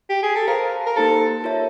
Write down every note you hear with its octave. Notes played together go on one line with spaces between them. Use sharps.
G4
G#4
A4
G#4 A#4 C5 F5 A5
A#4
A#3 D#4 G4 A4 C5
F4 A#4 C#5 E5 A5